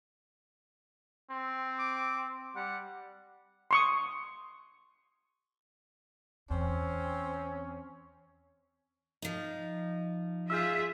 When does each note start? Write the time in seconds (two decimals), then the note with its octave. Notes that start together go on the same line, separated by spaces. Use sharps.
1.31 C4
1.79 D6
2.56 G3 F#5
3.71 C6 C#6 D#6
6.50 E2 C4 C#4
9.22 F3 D#4
10.50 F4 G#4 E5 E6 F6 G6